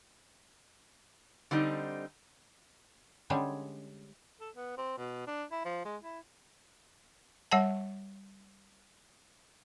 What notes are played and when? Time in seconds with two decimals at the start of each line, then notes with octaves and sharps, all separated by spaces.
1.51 D3 G3 C4 D#4
3.30 D3 G3 G#3 C#4
4.40 A4
4.56 B3
4.78 C4
4.97 B2
5.27 D4
5.51 E4
5.65 F3
5.85 G#3
6.02 E4
7.51 G3 C#5 F#5 A5